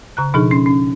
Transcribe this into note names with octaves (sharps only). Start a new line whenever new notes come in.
C#3 A#5 F#6
B2 F3 D4 D#4 G#4
C#4 C6
C#4